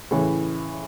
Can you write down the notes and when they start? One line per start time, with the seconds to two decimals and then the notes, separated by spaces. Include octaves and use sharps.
0.11 A2 C#3 E3